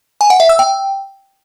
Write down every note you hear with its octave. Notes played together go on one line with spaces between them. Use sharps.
G#5
F#5
E5
E6
G5